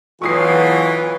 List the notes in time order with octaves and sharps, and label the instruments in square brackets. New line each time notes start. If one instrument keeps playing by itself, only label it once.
[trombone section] B1 [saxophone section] E3 [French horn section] F4 [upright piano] C#6 D#6 C7